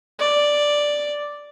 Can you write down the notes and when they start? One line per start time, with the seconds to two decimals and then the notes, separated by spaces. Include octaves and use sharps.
0.19 D5